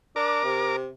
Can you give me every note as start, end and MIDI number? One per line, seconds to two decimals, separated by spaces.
0.16 0.43 62
0.16 0.76 70
0.16 0.76 86
0.44 0.88 48